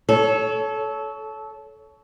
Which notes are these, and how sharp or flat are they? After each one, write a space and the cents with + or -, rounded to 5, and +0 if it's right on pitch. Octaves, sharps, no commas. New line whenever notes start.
A4 -20 C#5 +20